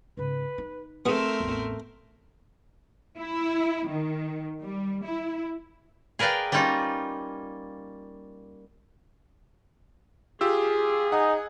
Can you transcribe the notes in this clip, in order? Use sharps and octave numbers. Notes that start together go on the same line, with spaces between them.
G#2 C#3 B4
D#4
A3 B3 C4 G#4 A#4 C6
A1 E2
E4
D#3
G3
E4
G#4 A#4 B4 D5 F5 G5
G3 A#3 C#4 D#4 F4
F4 G4 G#4 E6
D#4 F#5 G#5